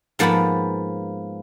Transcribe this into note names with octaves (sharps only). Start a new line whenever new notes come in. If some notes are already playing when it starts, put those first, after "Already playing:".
G#2 F3 A#3 B3 A5 B5